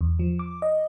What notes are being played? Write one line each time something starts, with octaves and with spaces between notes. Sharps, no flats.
E2
F3
D6
D#5